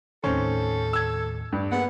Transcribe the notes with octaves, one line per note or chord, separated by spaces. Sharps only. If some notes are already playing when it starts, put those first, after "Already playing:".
D#2 A2 D#3 C4 C#4 A4
E6 G#6
G2 C#6
A#3 B3 G#4 A#4 F#5